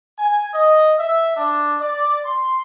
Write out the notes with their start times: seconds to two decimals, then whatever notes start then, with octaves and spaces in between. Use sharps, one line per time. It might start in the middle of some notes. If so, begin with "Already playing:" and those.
0.19 G#5
0.54 D#5
0.99 E5
1.37 D4
1.81 D5
2.25 C6